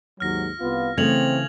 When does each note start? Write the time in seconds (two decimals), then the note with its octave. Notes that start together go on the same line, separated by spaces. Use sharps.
0.20 D#2 G#2 F#3 F6 A#6
0.60 C2 B3 F4
0.97 C#3 E3 A3 C4 G#6 F7 F#7